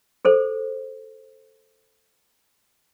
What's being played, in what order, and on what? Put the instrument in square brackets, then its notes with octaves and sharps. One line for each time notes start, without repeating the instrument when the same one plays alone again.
[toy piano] G#4 A4 C5